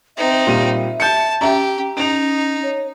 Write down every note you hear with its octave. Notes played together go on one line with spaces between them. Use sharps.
C4 D#4 E5
A#2 G3 D#7
A5 G6 C#7
C#4 G4 E5 A#5
C#4 D#4 D7 F7
C#5